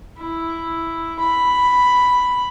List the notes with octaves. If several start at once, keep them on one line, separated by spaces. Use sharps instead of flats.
E4
B5